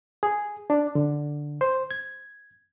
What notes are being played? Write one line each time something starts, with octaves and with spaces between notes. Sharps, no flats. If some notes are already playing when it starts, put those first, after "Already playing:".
G#4
D4
D3
C5
G#6